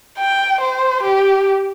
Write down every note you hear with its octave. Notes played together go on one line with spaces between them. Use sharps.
G5
C5
G4